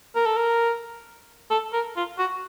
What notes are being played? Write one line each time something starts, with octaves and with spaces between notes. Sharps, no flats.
A#4
A4
A#4
A4
A#4
F4
F#4